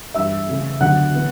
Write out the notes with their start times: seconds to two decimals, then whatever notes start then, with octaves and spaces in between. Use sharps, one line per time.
0.14 G2 E3 G3 E5 E6
0.48 C#3 E3 A3
0.80 D2 D3 F#3 B3 D4 F#5 F#6
1.14 A2 E3 B3